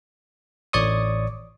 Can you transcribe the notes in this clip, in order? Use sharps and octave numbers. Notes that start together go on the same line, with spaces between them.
A1 C#5 D5 C#6 D#6